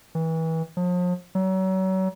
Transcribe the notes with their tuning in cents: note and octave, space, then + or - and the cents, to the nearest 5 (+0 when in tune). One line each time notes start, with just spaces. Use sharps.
E3 -30
F3 +40
F#3 +35